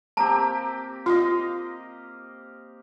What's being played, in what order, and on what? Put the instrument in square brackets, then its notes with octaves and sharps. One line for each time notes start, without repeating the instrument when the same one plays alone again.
[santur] A#3 C4 G4 [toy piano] A5 A#5
[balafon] F4 [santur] D#5 F5